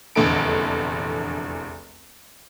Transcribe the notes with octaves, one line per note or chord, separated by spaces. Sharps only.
F1 A#1 E2 D3 A4 D7